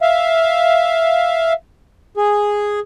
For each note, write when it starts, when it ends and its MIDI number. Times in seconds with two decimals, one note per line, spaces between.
0.02 1.53 76
0.02 1.53 77
2.17 2.80 68